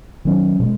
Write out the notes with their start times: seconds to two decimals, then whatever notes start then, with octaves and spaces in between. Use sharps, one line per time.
0.25 D#3 F#3 C#4
0.60 B2 G#3